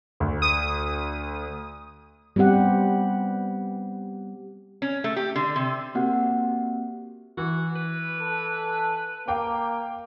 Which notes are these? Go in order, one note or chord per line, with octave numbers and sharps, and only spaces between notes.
D2
D#6
G3 B3 C4 G4 F#5
C#4
A3
G4
D3
C3
A#3 C4 F#4 G4 F#5
E3 F#4
B4
A4
A#3 F5 G5 D6